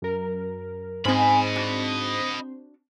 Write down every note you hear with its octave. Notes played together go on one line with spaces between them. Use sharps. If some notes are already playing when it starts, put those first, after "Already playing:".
F#2 A#4
G#2 C4 C#4 C5 D#5 G#5 B5
D4 F#4